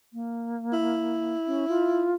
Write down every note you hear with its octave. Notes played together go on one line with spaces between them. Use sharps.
A#3
E4
C#4
F4